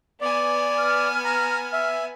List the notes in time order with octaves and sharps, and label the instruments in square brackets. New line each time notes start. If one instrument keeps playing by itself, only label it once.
[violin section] B3 G#5 [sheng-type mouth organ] D5
[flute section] F6
[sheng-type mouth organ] A#5
E5